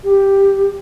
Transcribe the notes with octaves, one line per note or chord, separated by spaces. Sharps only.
G4